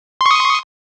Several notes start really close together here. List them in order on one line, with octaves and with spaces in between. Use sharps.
C6 C#6 D#6